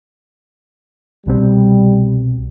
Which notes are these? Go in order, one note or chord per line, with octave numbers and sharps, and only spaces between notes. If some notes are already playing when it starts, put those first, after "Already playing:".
C2 B2 G3 C4